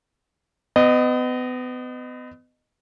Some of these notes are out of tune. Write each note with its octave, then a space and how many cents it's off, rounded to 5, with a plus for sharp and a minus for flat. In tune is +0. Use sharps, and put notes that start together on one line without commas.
B3 +35 D#5 -20